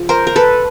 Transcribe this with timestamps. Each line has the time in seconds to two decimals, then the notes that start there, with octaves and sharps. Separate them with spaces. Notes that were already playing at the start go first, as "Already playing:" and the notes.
Already playing: C#3 F3
0.09 A#4 C5
0.27 A#4
0.36 A4 B4